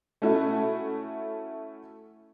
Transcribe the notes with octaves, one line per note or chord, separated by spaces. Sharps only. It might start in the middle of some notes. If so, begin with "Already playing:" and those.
A3 C#4 E4 F#4 A4